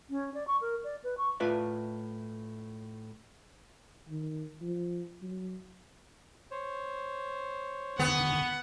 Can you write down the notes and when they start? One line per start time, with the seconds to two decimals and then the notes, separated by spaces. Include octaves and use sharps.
0.10 C#4
0.34 D5
0.47 C#6
0.61 A#4
0.84 D5
1.04 B4
1.18 C#6
1.40 A2 A3 F4 B4 D5 E5
4.09 D#3
4.62 F3
5.22 F#3
6.51 C5 C#5
7.99 E1 D3 D#3 B3 F#5 G#5 C#6